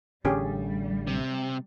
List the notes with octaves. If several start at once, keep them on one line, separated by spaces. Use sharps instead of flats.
A1 D3 G3 C#4 G4 G#4
C3